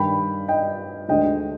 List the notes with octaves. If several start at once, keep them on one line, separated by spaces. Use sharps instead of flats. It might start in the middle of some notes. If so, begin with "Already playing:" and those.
Already playing: G2 D#3 G3 G5 B5
D#5 G5
D2 D3 G#3 D#5 G5